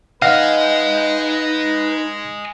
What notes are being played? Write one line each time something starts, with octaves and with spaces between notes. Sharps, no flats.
D#4 B4 D#5 F5 F#5 G#5